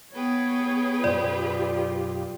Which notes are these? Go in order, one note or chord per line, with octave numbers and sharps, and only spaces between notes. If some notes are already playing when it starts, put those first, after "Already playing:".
B3 G#4 B4 C#5 G5
B1 F#2 F4 G4 C5 D5